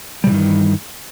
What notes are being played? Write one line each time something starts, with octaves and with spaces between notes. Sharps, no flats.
G2 C3 D#3 E3 G3